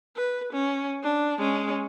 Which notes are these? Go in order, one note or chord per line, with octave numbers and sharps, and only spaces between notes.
B4
C#4
D4
G#3 C#4